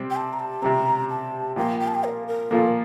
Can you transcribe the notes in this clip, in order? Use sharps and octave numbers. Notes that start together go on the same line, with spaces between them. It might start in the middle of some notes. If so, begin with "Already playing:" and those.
Already playing: C3 G3 C4
G5
A5
A#5
A5
C3 G3 C4 A#5
A5
A#2 F3 A#3 G5
G5
A5
G5
A#4
A#4
A#2 F3 A#3 A4
A#4